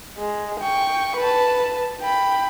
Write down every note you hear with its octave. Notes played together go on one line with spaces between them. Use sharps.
G#3
G5 C#6
B4 A5
G5 B5